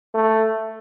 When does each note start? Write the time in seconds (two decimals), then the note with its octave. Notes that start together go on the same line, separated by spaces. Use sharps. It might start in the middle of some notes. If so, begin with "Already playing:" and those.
0.14 A3